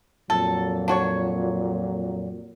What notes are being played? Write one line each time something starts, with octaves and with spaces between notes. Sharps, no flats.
F2 A#2 F#3 A4
D4 F#4 C#5